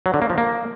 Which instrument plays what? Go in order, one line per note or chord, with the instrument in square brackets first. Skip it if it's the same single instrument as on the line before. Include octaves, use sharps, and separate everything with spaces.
[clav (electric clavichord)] F#3
D3
A#3
F3
A#3